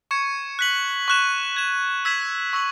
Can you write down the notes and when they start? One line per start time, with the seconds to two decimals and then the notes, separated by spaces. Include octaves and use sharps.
0.11 C#6 G#6 C#7 E7
0.59 F#6 B6 F#7
1.08 C#6 F#6 E7
1.56 G#6 E7
2.05 E6 G#6 B6 E7
2.53 C#6 E6 B6 F#7